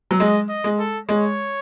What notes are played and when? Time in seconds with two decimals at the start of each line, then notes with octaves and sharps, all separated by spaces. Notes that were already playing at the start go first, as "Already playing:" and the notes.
0.11 F#3
0.20 G#3 D#5
0.49 D#5
0.64 G#3
0.79 A4
1.08 G#3 C#5